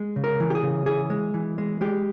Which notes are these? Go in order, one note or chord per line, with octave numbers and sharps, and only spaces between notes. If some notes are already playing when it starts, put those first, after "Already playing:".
Already playing: G#3
C#3
A#4
E3
G4
G#4
C#3
E3 G#4
G#3
E3
G#3
G#3 G4